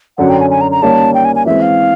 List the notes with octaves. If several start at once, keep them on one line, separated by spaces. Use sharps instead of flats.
F#2 D3 F#3 F#5
G5
G#5
G#5
A#5
A#5
D#3 G3 A#3 C#4 A5
G5
G#5
G#5
E3 G#3 C4 E5
F5